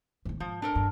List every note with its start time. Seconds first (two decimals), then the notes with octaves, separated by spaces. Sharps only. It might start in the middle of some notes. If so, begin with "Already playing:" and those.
0.25 G#2 D#3
0.40 G#2 F3
0.62 D4 A4 A#4
0.75 G2